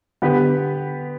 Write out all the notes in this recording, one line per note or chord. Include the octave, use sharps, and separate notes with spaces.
D3 B3 G4 B4